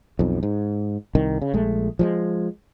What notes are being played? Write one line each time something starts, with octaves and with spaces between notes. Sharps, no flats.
B1 F2
G#2
C2 D#3
C#3
A#1 G#3 A3
F3 G3 G#3